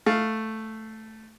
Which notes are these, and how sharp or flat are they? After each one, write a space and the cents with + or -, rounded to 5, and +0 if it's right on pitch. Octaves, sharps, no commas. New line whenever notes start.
A3 +0 F5 +0